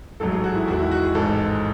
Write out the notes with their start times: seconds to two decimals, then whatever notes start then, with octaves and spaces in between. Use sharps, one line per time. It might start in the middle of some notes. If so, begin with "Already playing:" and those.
0.20 A1 G#2 F#3 A3 A4
0.32 G#4
0.44 F#4
0.55 E4
0.68 E2 D#3 G#3 F#4
0.79 E4
0.91 F#4
1.03 G#4
1.15 A1 G#2 D#3 G#3 A4